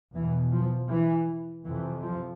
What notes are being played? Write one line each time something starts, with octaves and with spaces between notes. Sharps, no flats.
E2 B2 E3
F3
E3
F2 C3 E3
F3